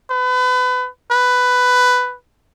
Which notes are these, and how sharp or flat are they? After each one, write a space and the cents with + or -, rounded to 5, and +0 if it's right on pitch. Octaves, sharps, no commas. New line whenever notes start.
B4 +30
B4 +10